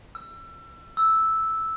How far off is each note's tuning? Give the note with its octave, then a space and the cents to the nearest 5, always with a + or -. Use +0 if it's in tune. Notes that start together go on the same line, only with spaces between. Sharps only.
E6 +30
E6 -5